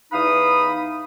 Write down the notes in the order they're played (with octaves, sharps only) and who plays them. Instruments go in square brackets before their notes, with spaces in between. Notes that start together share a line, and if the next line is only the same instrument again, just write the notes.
[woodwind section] E2 E3 D#4 F5 B5 D#6